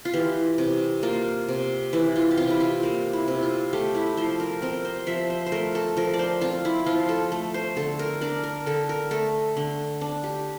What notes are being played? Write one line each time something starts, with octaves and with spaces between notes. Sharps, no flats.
F4
E3 G4
C3
A#3 F4
C3
E3 E4
F4
G4
C3 F4
E4
F4
A#3
E4
C3
F4
A3 G4
E4
F3 C5
A#4
C4 A#4
C5
F3 E5
C5
C5
A3 A#4
A4
F3 A#4
D5
C5
C4 F4
E4
F3 F4
A4
A3
C5
D3 A4
A#4
D4 A#4
A#4
D3 A4
A#4
A3 A4
D3
D4
G4